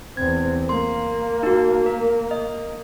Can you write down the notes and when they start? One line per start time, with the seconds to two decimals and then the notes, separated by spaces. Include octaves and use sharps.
0.17 E2 C4 G#6
0.69 A#3 C6
1.43 D#4 F#4
1.86 A#4
2.31 D#5